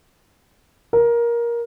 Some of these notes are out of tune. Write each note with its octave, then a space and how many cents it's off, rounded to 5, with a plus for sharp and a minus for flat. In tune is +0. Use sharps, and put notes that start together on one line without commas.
A#4 +15